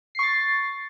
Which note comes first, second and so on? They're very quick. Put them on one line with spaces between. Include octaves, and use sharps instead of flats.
C7 C#6 A6